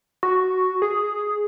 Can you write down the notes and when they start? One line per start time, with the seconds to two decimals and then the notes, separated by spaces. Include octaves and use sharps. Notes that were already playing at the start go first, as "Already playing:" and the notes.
0.23 F#4
0.82 G#4